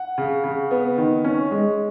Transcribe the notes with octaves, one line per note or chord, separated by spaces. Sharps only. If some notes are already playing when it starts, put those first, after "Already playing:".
Already playing: F#5
C#3
C#3
B3
D#3
C#4
G#3